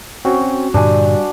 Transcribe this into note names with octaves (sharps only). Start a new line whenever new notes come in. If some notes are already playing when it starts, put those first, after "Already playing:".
C4 C#4 F#4
G2 A#2 D3 G3 D4 G#5